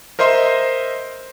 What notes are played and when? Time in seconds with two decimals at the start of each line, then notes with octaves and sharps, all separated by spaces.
0.19 A#4 C5 D#5 E5 C6